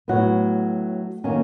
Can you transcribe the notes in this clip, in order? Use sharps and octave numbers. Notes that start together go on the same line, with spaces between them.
A2 F#3 B3 F#4
D#3 F#3 A#3 C#4